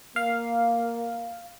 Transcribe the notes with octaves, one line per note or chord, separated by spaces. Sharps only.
A#3 F5